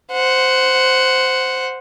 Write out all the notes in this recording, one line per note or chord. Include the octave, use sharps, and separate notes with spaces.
C5 F#5